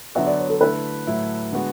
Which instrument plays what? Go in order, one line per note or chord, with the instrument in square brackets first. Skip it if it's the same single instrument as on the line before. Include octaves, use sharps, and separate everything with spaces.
[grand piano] D3 F#3 B3 F#4 [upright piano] E5
[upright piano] D5
C#5
A4
[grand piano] D3 A3 E4 [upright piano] B4
[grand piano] A2 F#3 A3 E4
D3 G#3 B3 F#4